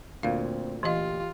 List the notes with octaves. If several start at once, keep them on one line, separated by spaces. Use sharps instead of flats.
D2 A#2 C4 F5
E3 F4 G4 D#5